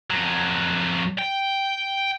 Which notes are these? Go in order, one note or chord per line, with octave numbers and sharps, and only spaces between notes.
F2 F#3
G5